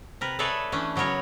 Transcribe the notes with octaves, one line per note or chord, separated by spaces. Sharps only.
C3 A#4 B4
G#4 A4 B4 C#5 D5 E5
E3 A3 C#4 D4
C#3 F#3 B3 A#4 C#5